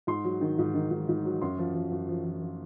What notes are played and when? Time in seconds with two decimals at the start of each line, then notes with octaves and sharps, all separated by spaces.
0.07 G#2 C6
0.24 F#3
0.41 D#3
0.59 G#2
0.75 D#3
0.91 G#2
1.09 G#2
1.25 F#3
1.42 F#2 C6
1.58 F3
1.74 F3
1.92 F#2
2.08 F3
2.25 F3
2.42 F3